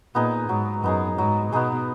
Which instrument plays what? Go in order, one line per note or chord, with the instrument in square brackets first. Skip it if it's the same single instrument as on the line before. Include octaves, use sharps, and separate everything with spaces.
[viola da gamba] A#2 [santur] B3 D#4 G#4
[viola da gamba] G#2 [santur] F#3
[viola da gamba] F#2 [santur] B3 D#4 G#4
[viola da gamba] G#2 [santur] F#3
[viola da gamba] B2 [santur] B3 D#4 G#4